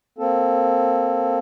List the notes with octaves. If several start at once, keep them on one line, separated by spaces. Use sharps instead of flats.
A#3 C4 A4